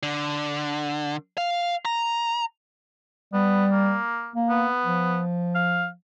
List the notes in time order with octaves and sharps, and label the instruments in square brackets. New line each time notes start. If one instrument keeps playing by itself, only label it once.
[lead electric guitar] D3
F5
A#5
[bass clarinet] G3 [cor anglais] B3
[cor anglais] A#3
[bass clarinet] A#3
[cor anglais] B3
[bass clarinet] F3
[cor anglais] F5